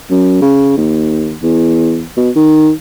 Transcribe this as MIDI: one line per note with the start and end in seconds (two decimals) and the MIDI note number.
0.10 0.39 42
0.41 0.75 49
0.77 1.36 39
1.43 2.05 40
2.17 2.30 47
2.36 2.71 51